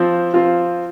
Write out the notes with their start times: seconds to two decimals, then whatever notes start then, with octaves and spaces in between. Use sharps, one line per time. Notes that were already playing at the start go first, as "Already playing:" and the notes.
Already playing: F3 C4 F4
0.33 F3 C4 F4